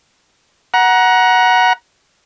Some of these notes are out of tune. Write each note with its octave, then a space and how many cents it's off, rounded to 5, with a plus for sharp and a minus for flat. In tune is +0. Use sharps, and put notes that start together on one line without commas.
F#5 +0 A#5 +25